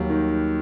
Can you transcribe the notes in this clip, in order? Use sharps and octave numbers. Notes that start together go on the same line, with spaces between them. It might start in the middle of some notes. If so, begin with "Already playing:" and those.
Already playing: D#2 F#3 G3
D#3